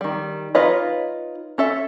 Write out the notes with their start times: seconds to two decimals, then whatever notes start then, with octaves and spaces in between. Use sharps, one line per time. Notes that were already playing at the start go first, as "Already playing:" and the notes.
0.01 D#3 G3
0.55 D#4 F4 B4 C#5 D#5
1.58 C#4 A4 E5